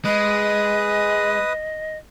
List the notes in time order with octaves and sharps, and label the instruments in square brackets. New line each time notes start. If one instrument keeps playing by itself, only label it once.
[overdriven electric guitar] G#3 [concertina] B4 D#6 [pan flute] D#5